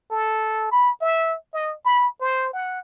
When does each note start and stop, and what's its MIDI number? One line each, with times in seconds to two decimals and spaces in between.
0.11 0.70 69
0.72 0.90 83
1.01 1.36 76
1.53 1.74 75
1.85 2.07 83
2.20 2.52 72
2.54 2.79 78